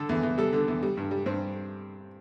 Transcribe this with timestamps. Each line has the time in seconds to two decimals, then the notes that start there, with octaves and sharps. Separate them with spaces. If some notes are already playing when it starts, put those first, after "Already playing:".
Already playing: D3 A4
0.09 E2
0.23 E2
0.38 G3 A4
0.53 D3
0.68 E2
0.83 G3
0.97 G2
1.11 G3
1.26 G2 C4